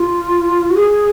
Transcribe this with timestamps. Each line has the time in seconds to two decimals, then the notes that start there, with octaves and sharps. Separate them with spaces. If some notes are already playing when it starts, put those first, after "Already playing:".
Already playing: F4
0.70 F#4
0.76 G#4